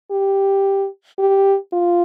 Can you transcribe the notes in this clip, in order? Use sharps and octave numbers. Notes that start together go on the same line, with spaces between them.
G4
G4
F4